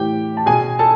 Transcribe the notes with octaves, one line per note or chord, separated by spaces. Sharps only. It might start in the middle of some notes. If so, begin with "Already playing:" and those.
Already playing: A2 E3 G4 G5
A5
B2 G#4 G#5
A4 A5